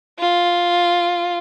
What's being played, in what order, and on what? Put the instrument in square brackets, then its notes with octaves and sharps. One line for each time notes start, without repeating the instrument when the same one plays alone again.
[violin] F4